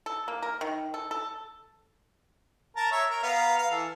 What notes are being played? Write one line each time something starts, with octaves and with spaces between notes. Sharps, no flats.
A4
A#3
A#4
D#3
A4
A4
A#4 A5 A#5
C#5 E5
A#4
B3 F5 A#5
F5
E3 A4